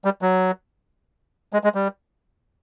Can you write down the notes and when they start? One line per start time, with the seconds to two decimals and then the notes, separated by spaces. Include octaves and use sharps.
0.05 G3
0.22 F#3
1.53 G#3
1.64 G#3
1.75 G3